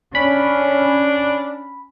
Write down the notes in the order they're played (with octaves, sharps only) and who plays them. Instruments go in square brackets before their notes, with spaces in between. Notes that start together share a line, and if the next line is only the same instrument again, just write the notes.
[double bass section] C#4 [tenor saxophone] D4 [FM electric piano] B5